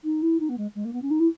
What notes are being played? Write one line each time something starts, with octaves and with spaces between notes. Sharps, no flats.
D#4
E4
D#4
B3
G#3
G#3
A#3
B3
C#4
D#4
E4